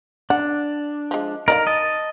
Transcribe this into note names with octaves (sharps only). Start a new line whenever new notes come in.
D4 F#5
F3 G#3
D#4 A#4 D5 F5
D#5 A5